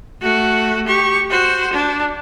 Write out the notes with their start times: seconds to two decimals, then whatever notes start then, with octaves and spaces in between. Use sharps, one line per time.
0.22 A3 F#4
0.87 G4 C#6
1.30 F#4 C5
1.73 D4